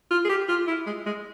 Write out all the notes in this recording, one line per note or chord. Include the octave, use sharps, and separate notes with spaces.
F4
G#4
G4
F4
E4
G#3
G#3